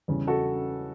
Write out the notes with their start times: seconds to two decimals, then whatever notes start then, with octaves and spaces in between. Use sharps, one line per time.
0.08 E2 C#3 G3
0.27 F#4 A4